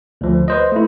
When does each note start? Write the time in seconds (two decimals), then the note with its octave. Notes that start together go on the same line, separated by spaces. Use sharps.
0.21 D2 F3
0.48 B4 C5 D#5
0.72 A3 E4